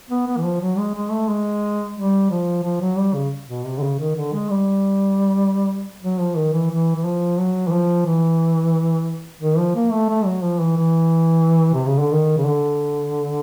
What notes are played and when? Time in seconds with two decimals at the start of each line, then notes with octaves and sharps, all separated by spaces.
0.10 B3
0.27 B3
0.37 E3
0.44 F3
0.61 F#3
0.78 G#3
0.95 G#3
1.12 A3
1.29 G#3
1.96 G3
2.31 F3
2.64 F3
2.81 F#3
2.98 G3
3.14 C#3
3.49 B2
3.65 C3
3.78 D3
3.83 C#3
4.00 D#3
4.16 D3
4.34 G#3
4.50 G3
6.03 F#3
6.20 F3
6.37 D#3
6.53 E3
6.70 E3
6.96 E3
7.05 F3
7.38 F#3
7.68 E3
7.72 F3
8.06 E3
9.41 D#3
9.58 F3
9.76 A#3
9.92 A3
10.10 A3
10.26 F#3
10.43 F3
10.60 E3
10.77 E3
11.75 C3
11.87 C#3
12.00 D3
12.12 D#3
12.38 C#3
12.47 D3